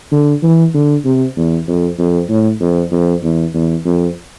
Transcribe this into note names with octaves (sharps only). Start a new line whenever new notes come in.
D3
E3
D3
C3
E2
F2
F2
A2
F2
F2
E2
E2
F2